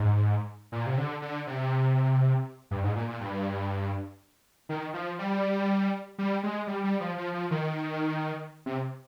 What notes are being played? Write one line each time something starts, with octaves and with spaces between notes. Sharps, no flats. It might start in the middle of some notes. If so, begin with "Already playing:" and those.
Already playing: G#2
A#2
C3
D3
D3
C3
G2
G#2
A#2
A#2
G2
D#3
F3
G3
G3
G#3
G3
G3
F3
F3
F3
D#3
C3